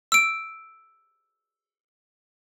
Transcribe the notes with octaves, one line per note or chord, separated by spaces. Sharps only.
E6 D7